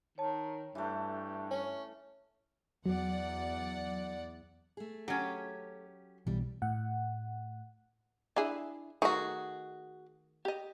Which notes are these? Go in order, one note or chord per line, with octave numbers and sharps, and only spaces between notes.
D#3 C#5 A5
G2 E3 A3
C#4
E2 F#3 D5 F#5
A3 G#4
F#3 C#4 G4
B1 B2 E3 G3
A2 F#5
D4 E4 G#4
D#3 A3 F#4 G#4 A#4
G4 D#5